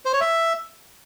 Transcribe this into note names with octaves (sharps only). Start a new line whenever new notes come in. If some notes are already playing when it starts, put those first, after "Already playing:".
C5
C#5
E5